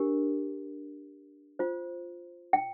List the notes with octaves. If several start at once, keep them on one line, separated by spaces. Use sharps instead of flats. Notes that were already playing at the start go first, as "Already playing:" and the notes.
Already playing: D4 G4 A#4
F4 C5
G5